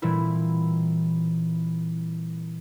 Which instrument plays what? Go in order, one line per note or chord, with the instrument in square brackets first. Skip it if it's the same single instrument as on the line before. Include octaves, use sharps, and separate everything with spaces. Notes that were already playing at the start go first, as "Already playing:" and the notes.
[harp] A#2 E3 G3 C4 E4